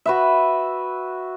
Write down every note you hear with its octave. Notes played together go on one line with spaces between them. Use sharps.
F#4 B4 E5